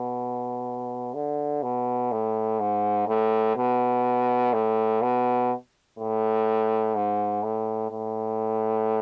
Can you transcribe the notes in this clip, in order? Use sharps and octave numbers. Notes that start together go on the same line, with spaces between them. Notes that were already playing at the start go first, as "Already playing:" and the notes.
Already playing: B2
D3
B2
A2
G#2
A2
B2
A2
B2
A2
G#2
A2
A2